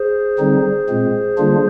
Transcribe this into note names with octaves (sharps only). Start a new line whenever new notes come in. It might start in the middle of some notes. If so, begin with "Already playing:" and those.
Already playing: G#4 C5
D3 G3 C4 D#4
A#2 G#3 C4
D3 G3 A#3 D4 F4